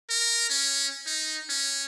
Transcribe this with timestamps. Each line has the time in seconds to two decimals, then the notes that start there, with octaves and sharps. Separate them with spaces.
0.10 A#4
0.50 C#4
1.06 D#4
1.50 C#4